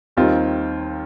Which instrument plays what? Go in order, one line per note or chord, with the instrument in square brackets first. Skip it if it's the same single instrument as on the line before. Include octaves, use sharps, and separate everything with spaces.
[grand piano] D#2 D#3 G3 C4 F4